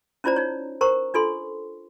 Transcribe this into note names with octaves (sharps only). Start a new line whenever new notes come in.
C#4 E4 F4 C5 D5 A#5
D#4 C#5
A#4 C5 A#5 C#6
D4 F4 A4 C6